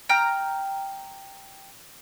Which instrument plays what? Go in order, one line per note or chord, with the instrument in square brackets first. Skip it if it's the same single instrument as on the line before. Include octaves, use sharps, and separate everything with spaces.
[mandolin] G5 A#5 F6